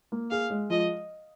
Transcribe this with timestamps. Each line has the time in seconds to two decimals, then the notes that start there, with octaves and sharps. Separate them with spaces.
0.12 A#3
0.30 G#4 F5
0.50 G#3
0.70 F3 D#5